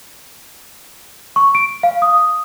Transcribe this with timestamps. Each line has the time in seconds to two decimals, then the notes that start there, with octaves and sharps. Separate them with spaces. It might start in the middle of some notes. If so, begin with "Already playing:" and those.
1.36 C#6
1.55 D7
1.83 F5
2.02 D#6